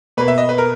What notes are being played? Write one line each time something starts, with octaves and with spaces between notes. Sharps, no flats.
B2 A#3 B4
E5
D#5
B4
A#4